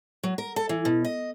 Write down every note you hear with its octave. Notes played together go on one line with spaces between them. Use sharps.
F#3
A#4
A4
E3
B2
D#5